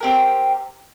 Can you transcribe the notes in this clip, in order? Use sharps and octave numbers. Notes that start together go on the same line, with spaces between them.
C4 G4 A#4